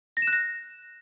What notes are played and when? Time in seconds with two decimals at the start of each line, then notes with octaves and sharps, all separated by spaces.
0.17 A#6
0.22 E7
0.27 F#6
0.33 A#6